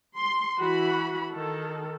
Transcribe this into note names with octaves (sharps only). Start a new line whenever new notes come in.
C6
E3 F#4 B5
D#3 A4